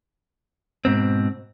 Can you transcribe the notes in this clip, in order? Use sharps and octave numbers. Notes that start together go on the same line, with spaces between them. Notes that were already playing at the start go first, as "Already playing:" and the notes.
G#2 B2 C4